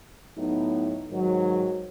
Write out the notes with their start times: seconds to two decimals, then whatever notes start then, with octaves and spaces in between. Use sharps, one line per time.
0.37 A2 F#3 B3 D#4
1.09 G#2 D#3 F#3